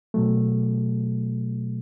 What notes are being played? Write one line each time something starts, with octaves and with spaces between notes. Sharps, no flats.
B2 F#3 A3